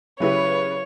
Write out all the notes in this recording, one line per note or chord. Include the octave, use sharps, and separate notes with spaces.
C#3 F#3 E4 G4 B4 C#5